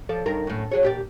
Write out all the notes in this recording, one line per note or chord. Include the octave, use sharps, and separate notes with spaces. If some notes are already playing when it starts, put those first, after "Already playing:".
F3 A4 D5
G2 D#3 A#4
F#2 A2
F#3 G#4 C#5
A#2 G4 D5